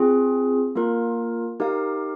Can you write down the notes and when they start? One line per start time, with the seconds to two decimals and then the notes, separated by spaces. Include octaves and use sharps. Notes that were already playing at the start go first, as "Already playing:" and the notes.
Already playing: C4 F4 G#4
0.76 A#3 F4 A#4
1.60 D#4 G4 A#4 F5